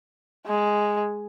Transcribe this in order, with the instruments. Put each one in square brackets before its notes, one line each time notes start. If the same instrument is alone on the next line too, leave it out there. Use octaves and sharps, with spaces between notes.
[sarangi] G#3